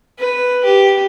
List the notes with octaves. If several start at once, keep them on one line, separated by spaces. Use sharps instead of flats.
B4
G4